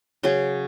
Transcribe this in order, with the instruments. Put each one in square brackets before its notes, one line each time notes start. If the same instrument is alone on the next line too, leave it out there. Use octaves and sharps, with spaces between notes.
[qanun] C#3 F#3 C#4 G#4